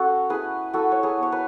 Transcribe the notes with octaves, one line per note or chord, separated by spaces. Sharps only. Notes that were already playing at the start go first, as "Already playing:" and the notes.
Already playing: C#4 F#4 A4
E4 G#4 B4
E4 F#4 A4
C#5
G#4 B4
B3 C#5
B4